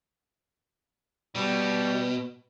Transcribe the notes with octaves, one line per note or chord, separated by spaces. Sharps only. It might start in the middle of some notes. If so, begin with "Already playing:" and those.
B2 G3